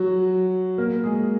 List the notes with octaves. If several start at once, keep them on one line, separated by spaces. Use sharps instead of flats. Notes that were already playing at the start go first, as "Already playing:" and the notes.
Already playing: F#3 F#4
A#3 A#4
G#3 G#4